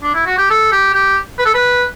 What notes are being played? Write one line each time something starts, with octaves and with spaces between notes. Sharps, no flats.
D4
E4
F#4
G4
A4
G4
G4
B4
A4
B4